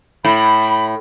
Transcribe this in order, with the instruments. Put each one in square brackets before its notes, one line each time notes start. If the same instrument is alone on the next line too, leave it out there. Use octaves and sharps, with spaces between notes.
[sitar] A2 [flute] B5